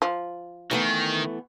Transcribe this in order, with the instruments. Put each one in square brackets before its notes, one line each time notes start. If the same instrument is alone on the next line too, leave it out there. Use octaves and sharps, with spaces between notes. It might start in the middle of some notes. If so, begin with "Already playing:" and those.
[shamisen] F3
[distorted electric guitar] D#3 [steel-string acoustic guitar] E3 A3 B3